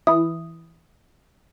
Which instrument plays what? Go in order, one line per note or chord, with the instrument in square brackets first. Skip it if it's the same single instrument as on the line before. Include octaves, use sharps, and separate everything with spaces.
[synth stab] E3 E4 [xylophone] D#6